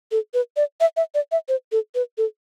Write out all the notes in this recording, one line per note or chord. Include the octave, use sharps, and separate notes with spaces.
A4
B4
D5
E5
E5
D5
E5
C5
A4
B4
A4